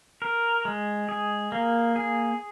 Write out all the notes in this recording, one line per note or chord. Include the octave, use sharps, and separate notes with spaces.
A#4
G#3
G#4
A#3
G#4